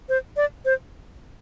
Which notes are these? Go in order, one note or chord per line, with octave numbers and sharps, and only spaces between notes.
C5
D5
C5